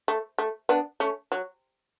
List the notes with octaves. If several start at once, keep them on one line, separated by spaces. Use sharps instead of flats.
A3
A3
B3 D4
A3 C#4
F#3